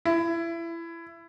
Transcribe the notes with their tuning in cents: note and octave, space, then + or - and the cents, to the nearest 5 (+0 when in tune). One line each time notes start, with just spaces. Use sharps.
E4 +25